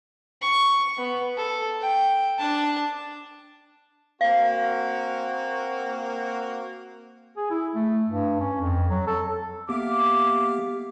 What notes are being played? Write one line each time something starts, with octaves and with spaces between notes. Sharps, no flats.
C#6
B3
A4
G5
D4 A5
A#3 C4 F#4 F5
G#4
E4
A3
G2
C#4
F2
F#3
A4
A#3 B3 G4 E5 F5 D6